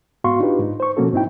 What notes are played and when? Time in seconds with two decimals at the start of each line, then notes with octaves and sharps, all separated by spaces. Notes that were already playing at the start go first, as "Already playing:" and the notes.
0.24 G#2 B3 F#4 F5 C6 C#6
0.40 D4 D#4 F4 G4 B4
0.59 G#2 D#4
0.80 C5 C#6
0.97 B2 F3 A#3 C#4 F#4 A4
1.13 G#2 C4 D#4 E4 G5